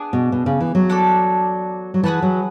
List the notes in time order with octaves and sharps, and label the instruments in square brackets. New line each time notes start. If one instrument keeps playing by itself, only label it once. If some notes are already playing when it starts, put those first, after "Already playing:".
Already playing: [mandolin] B3 D4 G#4
[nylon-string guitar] B2
B2
C#3
E3
F#3
[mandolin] D4 A4 D5
[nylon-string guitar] F#3
[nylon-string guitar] E3 [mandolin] G#4 B4 F#5 A5
[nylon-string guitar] F#3